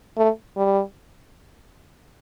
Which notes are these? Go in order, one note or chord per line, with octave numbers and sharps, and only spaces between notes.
A3
G3